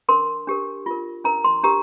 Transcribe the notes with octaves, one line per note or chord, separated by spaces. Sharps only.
D4 A#4 C6
D4 G4 A#4
F4 A#4
D4 A#4 A#5
C6
D4 G4 A#4 A#5